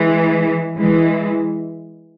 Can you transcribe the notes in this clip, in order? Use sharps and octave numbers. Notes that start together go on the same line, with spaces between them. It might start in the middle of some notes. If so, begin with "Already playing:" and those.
Already playing: E3 G#3
E3 G#3